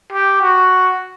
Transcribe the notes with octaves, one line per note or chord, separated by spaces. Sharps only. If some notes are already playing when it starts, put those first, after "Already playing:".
G4
F#4